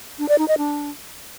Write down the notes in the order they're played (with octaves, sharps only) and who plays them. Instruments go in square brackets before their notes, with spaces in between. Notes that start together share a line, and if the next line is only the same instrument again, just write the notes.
[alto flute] D4
D5
D#4
D#5
D4